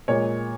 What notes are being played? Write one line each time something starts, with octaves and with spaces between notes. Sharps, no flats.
A#2 G#3 C#5